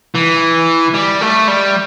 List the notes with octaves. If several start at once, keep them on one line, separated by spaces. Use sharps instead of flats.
E3
G3
A3
G3